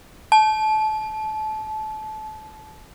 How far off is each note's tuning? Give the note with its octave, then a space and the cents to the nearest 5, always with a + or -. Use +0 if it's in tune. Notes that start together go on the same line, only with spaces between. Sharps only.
A5 -25